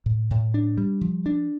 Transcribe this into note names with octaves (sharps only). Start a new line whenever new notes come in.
A2
A2
D4
G3
F3
D4